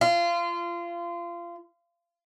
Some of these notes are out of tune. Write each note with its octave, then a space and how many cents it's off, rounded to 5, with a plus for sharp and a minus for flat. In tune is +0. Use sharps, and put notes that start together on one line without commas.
F4 -25